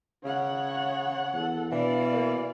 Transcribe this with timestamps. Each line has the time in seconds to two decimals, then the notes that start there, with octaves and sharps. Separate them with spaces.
0.25 C#3 C#5 F#5
1.34 E2 A4 F#5
1.72 B2 E3 D4 D5 F5
2.13 A#3